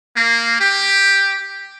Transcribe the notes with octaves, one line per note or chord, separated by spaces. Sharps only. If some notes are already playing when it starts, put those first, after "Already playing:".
A#3
G4